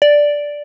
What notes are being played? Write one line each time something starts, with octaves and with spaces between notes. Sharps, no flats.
D5